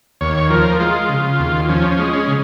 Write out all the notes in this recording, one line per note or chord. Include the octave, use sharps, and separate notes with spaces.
D#2 C#5
F3 A#4
G#3 F4
C#3
D#2
F3 C#4
C#4
G#3
C#4
C#3